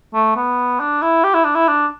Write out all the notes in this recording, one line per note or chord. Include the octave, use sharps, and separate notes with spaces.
A3
B3
D4
E4
G4
E4
D4
E4
D4